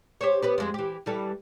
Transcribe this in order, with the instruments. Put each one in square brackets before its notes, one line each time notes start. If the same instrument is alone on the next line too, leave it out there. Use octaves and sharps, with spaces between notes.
[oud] G4 C5 C#5
B3 G4 B4
F2 G#3 C4
E3 G4
E3 G3 A4